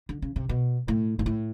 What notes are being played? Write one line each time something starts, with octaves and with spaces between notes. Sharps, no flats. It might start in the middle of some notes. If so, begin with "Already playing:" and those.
D3
C#3
C3
B2
A2
G#2
A2